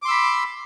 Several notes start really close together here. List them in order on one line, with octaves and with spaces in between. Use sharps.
D6 C6 E6 B5